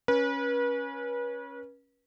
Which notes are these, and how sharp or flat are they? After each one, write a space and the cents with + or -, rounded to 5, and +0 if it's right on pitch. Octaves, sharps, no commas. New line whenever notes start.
C#4 +0 B4 -35